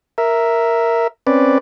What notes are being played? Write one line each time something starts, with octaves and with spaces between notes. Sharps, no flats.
A#4 E5
C4 C#4 B4 D5